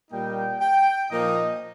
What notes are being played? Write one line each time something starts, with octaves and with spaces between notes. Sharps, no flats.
A#2 G3 A#3 D#4 G5
G5
A#2 F3 A#3 D#4 D#5